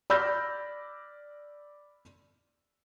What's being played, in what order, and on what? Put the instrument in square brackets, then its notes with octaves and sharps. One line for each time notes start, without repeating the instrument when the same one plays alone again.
[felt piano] D5 B5 E6 F6 G6 A#6